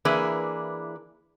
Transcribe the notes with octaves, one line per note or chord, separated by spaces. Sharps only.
E3 A#3 D4 E4 G#4 B4